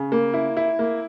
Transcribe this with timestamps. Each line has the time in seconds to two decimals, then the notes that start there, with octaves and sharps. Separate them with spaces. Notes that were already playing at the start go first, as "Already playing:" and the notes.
Already playing: C#3
0.12 A#3
0.34 E4
0.57 E4
0.79 A#3